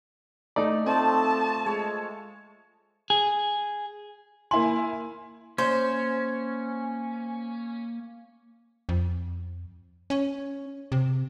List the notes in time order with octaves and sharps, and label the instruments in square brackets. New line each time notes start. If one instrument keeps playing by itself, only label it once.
[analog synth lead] A3 [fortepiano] D#4 D5
[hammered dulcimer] F3 A3 [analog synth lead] C4 [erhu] A5
[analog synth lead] G#3 [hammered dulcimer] C#5
[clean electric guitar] G#4
[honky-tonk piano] A#3 E4 G#5 [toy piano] C6
[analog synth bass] A#3 [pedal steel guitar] C#4 [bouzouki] C5
[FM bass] F2
C#4
C3